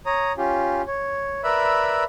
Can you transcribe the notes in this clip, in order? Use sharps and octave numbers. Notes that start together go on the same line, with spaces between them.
C#5 A#5 D#6
C#4 F4 G4
C#5
A#4 B4 D5 E5 B5 E6